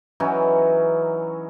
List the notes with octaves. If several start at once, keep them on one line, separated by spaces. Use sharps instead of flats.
E3 F#3 C#4 D#4